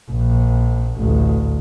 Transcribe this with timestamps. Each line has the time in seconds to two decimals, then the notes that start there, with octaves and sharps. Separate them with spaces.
0.11 A#1
1.00 A1 D2